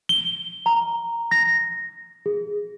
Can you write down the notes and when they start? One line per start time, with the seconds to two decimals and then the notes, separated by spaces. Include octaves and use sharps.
0.09 G7
0.66 A#5
1.31 A#6
2.26 G#4